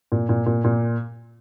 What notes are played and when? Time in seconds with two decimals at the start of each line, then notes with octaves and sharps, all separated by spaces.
0.12 A#2
0.29 A#2
0.46 A#2
0.64 A#2